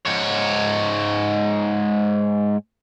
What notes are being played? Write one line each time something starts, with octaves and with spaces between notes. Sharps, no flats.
G#2 C#5